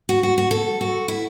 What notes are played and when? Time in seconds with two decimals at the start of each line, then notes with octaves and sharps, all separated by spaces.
0.09 F#4
0.23 F#4
0.38 F#4
0.51 A4
0.81 F#4
1.08 E4